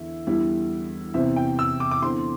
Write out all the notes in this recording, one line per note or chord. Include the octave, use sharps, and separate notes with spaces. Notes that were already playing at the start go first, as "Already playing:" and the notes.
Already playing: E2 D3 E4 E5
E2 D3 G3 E4
E2 C3 E3 C4 E5
G5
E6
D6
D6
E2 D3 C4 C6